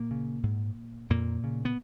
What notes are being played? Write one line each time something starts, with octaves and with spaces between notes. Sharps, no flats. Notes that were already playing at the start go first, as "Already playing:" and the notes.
Already playing: A#2 A#3
C#3
G#2
F2 A#2 A#3
C#3
B3